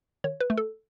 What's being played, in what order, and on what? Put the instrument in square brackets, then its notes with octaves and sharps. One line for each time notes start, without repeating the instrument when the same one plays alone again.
[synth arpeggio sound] D#3 C#5
B4
A3
A4